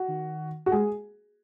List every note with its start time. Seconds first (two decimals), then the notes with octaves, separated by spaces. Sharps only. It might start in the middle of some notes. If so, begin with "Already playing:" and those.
Already playing: F#4
0.08 D#3
0.66 F#4
0.72 G#3 G#4